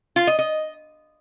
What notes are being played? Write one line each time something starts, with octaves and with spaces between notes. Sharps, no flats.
F4
D#5
D#5